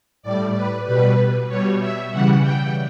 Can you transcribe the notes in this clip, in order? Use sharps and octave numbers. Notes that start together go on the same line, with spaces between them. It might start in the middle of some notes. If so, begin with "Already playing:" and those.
A2 G3 D5
B4
B2 G3 B4
B2 G3 C#5
E5
C#3 E3 G3 F#5
G5